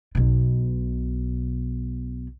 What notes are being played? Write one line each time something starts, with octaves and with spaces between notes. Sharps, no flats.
B1 B2